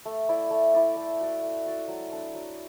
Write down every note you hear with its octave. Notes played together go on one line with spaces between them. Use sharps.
A3
E4 D5
A3
E4 D5
A3
F#4 D5
A3
F#4 D5
F#3
D4 A4 D5
F#3